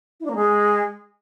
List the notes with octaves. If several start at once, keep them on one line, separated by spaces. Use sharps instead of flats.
E4
D4
A#3
G#3